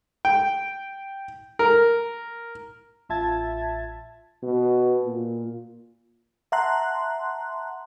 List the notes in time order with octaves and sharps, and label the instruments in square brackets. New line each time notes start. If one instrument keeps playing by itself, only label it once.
[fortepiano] G5
A#4
[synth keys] A1 F4 E5 A5 G#6 A6
[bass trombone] B2
A#2
[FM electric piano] E5 F#5 A5 A#5 C6 F#6